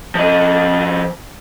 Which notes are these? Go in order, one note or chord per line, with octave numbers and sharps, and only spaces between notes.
F3 D#5